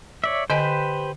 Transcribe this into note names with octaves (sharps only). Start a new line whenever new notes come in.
C#5 D5 E5
D3 G4 B4 C5 D#5 G#5